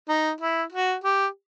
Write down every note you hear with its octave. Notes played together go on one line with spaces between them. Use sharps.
D#4
E4
F#4
G4